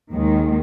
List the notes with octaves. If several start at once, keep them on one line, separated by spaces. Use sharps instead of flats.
D#2 D#3 G#3